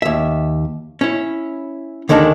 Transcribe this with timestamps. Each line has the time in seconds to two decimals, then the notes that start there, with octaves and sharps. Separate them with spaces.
0.02 D#2 E5
1.01 C#4 E4
2.09 D#2 D3 D#3 G#3 D4